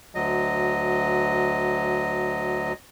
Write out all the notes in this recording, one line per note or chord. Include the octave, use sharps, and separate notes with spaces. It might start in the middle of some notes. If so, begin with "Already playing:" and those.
D2 F#3 D#5